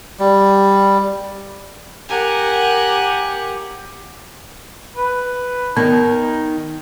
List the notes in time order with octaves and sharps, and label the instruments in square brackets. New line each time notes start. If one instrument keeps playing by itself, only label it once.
[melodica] G3
[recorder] G4 [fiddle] A#4 [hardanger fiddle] F#5 G#5
[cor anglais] B4
[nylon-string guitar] D#3 [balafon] B3 [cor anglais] D#4